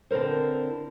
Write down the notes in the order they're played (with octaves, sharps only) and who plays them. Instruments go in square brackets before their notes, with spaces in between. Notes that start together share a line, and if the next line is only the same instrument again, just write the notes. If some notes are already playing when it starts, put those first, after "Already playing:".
[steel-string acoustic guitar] D3 C4 E4 A#4 C5